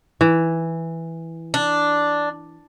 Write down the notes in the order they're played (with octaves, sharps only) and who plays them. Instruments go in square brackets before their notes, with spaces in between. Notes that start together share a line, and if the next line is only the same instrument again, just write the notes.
[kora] E3
[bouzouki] D4